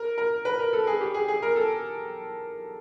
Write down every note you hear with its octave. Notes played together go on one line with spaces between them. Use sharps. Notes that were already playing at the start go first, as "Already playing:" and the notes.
Already playing: A#4
A#4
B4
A#4
A4
G#4
G4
G#4
G#4
A#4
A4